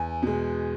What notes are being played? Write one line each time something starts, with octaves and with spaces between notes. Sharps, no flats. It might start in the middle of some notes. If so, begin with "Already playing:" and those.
Already playing: E2 G#5
B2 G#3